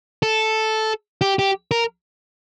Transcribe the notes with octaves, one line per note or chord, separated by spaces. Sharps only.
A4
G4
G4
A#4